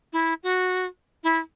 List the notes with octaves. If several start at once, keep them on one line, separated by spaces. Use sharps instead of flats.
E4
F#4
E4